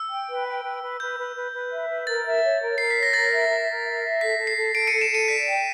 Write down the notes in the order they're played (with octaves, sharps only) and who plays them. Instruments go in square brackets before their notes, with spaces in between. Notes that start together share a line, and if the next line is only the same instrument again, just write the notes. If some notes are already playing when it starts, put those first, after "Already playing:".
Already playing: [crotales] E6
[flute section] G5
B4
G5
B4
B4
[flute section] B4 [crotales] G6
[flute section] B4
B4
B4
E5
B4
[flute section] A#4 [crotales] A6
[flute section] E5
C#5
A#4
[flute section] A#4 [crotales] C7
[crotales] B6
[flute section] C#5
[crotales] A#6
[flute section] A#4 [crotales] A6
[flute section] E5
A#4
A#4
E5
E5
[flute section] A4 [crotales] B6
[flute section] A4
[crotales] C7
[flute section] A4
[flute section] A4 [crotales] C7 D7
[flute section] A4 [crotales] C#7 D#7
[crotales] D7 E7
[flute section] A4 [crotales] C#7 D#7
[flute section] D5 [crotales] B6
[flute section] G5